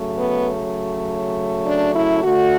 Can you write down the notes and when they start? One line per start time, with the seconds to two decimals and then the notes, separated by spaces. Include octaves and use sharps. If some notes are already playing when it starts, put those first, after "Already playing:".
Already playing: C#3 F#3 A3
0.18 B3
1.65 D4
1.94 E4
2.23 D3 A3 F#4